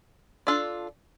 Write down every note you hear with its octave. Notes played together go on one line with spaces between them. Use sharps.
D4 F4 A4 D5